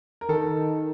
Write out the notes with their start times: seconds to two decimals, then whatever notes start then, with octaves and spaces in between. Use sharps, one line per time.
0.21 A#4
0.29 D#3 A4